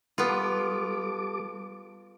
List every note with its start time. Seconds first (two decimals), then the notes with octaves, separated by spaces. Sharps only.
0.18 G3 B3 F4 A4 D6